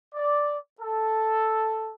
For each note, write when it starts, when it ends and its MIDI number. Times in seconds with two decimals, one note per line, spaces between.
0.15 0.57 74
0.80 1.90 69